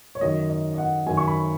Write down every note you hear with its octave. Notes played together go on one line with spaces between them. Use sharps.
C#5
F#2 D#3 D#5
D#5
D#5
F#5
F#2 D#3 G#5
C#6
B5